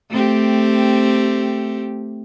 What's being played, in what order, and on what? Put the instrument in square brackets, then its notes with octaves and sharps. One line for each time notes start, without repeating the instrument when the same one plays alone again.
[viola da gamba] A3 C4 G4